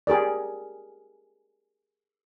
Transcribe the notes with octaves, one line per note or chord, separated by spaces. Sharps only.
G4 G#4 A#4 D5